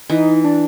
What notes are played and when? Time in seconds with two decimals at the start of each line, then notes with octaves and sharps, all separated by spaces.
0.10 E3 D#4
0.44 D4